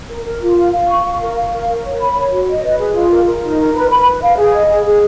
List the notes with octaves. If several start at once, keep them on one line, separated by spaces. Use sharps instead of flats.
A#4
A#4
F4
F5
F5
C#6
F5
A#4
F5
A#4
A#4
C#5
B5
C#5
F#4
D#5
B4
G#4
F4
A#4
A#4
D#4
A#4
B4
B5
B4
F5
G#4
D#5
G#4
G#4